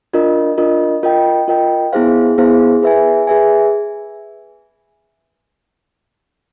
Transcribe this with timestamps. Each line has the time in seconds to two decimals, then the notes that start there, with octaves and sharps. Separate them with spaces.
0.13 D4 F4 A#4 D#5
0.58 D4 F4 A#4 D#5
1.03 F4 A#4 D#5 G5
1.48 F4 A#4 D#5 G5
1.93 B3 E4 G#4 C5 F5
2.38 B3 E4 G#4 C5 F5
2.82 G#4 B4 E5 G#5
3.27 G#4 B4 E5 G#5